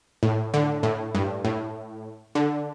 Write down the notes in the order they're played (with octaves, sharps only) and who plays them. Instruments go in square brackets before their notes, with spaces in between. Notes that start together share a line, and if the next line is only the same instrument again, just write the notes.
[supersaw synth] A2
D3
A2
G2
A2
D3